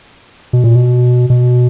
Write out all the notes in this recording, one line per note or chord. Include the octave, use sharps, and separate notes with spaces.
B2
A#2
B2
B2